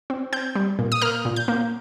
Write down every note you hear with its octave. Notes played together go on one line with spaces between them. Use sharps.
C4
C4 G6
G3
A#2
D#6
A#3 F6
A#2
G6
A#3